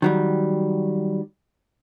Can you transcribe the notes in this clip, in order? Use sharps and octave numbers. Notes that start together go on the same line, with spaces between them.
D#3 F#3 G3